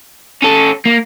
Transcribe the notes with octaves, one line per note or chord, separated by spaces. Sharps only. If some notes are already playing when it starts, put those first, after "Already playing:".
C#4 A4
A#3